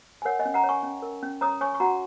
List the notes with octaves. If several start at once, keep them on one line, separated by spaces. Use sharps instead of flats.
G#5
A#4 C#5 F#5
D#5 G#5
C#4
F#5 A#5
C#5
G#5 C#6
C#4
A#4
C#4
C#5 A#5 D#6
C#5 G#5 C#6
C#6
F#4 F#5 A#5